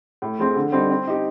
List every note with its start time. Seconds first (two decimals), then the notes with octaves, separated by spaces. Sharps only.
0.22 A2
0.39 F3 G#3 C4
0.56 D3
0.72 G3 C4 D#4
0.90 C4
1.07 D#4 G4